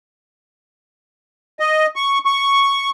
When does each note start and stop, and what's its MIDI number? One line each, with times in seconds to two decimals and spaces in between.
1.60 1.86 75
1.96 2.18 85
2.25 2.90 85